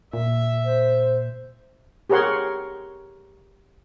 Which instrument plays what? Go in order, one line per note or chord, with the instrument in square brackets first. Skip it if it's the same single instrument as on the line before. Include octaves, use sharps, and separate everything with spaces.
[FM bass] A#2 [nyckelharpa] E5
[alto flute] C5
[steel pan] G4 G#4 A#4 C#5 F#5 C6